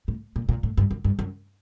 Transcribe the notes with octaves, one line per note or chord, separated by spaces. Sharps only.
A2
A#2
A#2
A2
G2
F#2
G2
F#2